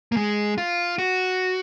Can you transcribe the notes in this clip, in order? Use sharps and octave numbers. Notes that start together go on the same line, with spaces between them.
A#3
G#3
F4
F#4